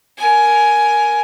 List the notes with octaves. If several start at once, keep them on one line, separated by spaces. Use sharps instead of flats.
A#4 G#5